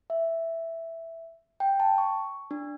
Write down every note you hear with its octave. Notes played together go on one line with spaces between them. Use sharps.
E5
G5
A5
C#6
D4